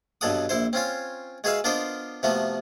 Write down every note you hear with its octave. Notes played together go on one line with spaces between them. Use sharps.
G2 B2 F#3 A4 F#5 D#6
A#1 E4 C5
C4 C#4 F4 C#5
G#3 F#4 G#4 B4 E5 F5
B3 D4 F4 A#4 C5 D#5
C3 F3 A3 B3 F#4